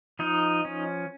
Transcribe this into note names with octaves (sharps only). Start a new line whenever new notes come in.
F3 D#4
C#4